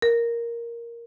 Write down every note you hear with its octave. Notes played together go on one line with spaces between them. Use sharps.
A#4